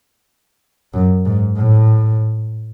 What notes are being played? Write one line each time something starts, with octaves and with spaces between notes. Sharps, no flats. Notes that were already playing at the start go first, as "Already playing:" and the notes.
F#2
G#2
A2